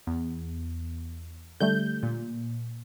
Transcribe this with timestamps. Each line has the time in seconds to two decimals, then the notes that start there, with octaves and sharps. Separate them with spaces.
0.07 E2
1.60 D3 G3 A3 G6
2.03 A#2